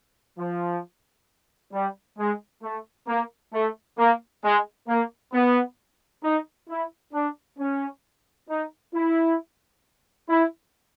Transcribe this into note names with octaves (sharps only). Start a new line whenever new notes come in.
F3
G3
G#3
A3
A#3
A3
A#3
G#3
A#3
B3
D#4
E4
D4
C#4
D#4
E4
E4